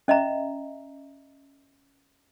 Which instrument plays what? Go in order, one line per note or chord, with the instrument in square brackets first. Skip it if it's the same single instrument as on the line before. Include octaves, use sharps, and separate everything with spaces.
[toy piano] C#4 D#5 E5 A#5